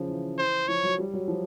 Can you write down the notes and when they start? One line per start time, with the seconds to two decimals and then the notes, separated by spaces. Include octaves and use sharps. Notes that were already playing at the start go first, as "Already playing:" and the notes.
Already playing: C#3 F3
0.08 E3
0.38 C5
0.68 F3 C#5
0.83 F#3
0.98 G3
1.14 F#3
1.28 F3